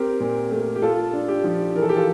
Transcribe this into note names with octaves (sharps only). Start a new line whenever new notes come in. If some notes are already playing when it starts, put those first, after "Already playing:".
Already playing: C4 G4 A#4
A#2
A3
G4
A3 F4 A4
D4
G4
F3
E3 A#4
A4
G4
F4 A4